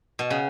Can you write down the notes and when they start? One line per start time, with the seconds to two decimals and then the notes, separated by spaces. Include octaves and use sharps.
0.19 B2
0.30 C#3